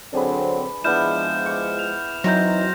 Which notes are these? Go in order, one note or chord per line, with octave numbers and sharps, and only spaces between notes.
D3 F#3 C4 D4 G#4 B4
F3 G#3 B3 D4 E4 F6 G6 E7
C#6 D6
F7
E3 F#3 C4 D#4 E4 A#5 G6 A#6